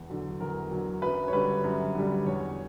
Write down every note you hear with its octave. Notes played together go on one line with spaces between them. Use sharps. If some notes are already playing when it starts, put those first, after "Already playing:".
Already playing: E2
D3 F#3
E2 A#4
D3 F#3
F#2 B4
C#5
D3 G3 B4
F#2
D3 G3
E2 C#5